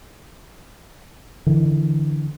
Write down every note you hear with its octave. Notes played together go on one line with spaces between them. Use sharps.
D3 E3